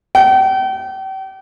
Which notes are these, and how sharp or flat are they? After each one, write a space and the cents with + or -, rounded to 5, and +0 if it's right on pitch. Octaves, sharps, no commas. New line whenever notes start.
G5 -40